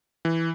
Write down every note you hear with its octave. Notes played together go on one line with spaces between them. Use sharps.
E3